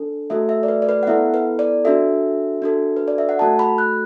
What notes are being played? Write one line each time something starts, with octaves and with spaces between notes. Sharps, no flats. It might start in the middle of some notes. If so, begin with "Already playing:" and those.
Already playing: D4 A4
A3 F#4 A4 E5
E5
D5
B4
D5
B4
F#5
B3 E4 A4 E5
B4
D5
D4 F#4 A4 E5
D4 F#4 A4
B4
D5
E5
F#5
A3 F#4 A4 A5
B5
F#6